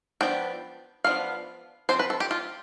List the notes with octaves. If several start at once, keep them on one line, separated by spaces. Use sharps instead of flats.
F3 B3 D4 G5
F3 B3 D4 F5
F3 C4 C5
B4
A4
G4
F4